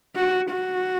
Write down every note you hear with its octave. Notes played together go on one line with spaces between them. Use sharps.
F#4
F#4